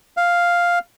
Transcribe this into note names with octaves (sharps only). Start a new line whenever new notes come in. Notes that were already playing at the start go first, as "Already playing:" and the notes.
F5